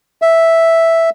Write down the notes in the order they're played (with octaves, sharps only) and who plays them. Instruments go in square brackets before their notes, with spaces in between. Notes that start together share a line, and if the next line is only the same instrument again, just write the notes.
[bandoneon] E5